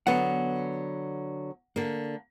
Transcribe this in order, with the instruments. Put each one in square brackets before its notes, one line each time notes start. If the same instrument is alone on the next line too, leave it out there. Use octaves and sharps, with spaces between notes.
[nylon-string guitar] D3 F#3 B3 [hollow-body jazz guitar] F#5
[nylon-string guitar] D3 A#3